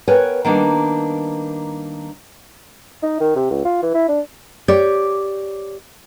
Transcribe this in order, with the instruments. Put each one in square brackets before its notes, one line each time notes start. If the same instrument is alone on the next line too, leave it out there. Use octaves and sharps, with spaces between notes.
[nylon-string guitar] B3 A#4 B4 C#5 G5 G#5
D#3 G3 A#3 B3 D4 D#4
[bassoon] D#4
D#3
C3
C#2
F4
E3
E4
D4
[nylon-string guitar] G4 C#5 D5